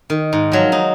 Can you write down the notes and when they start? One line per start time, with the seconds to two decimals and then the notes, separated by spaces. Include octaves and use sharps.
0.10 D#3
0.33 G#2
0.52 F3 F#3 G#3
0.72 D#4